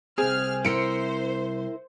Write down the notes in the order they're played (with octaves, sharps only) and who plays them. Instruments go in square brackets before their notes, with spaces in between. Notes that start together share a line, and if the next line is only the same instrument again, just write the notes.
[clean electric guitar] C2 C4 [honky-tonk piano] G#4 [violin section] F6
[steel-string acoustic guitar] E4 A#4 E5 [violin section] C5 [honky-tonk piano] C#7 D7